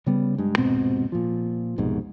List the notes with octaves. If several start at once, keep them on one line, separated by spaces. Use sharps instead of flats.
C#3 G3 B3
G2 G#3
D#1 G#2 B2 C4
A#2 F3
C2 F2 G#2 B2